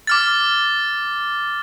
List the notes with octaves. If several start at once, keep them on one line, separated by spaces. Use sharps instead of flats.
D6 F6 A6